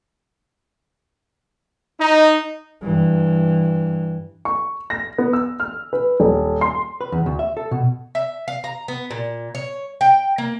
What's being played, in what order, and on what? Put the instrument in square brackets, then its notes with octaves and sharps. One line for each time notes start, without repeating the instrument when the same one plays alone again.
[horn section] D#4
[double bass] G2 E3
[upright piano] C#6
A#6
B3
E6
F6
B4
D#1
C6
[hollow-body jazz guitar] B4
E2
D2
E5
A4
B2
[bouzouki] E5
F5
A#5
B3
A#2
C#5
G5
A#3